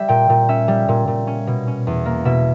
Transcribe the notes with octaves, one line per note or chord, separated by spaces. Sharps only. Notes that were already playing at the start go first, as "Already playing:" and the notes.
Already playing: G3 E5
A#2 G5
A#2
C#4 E5
G3
A#2
A#2
C#4
B2
C#4
E2
A#3
B2 E5